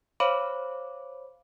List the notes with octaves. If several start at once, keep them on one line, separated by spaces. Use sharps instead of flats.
C5 C#5 F5 B5 D6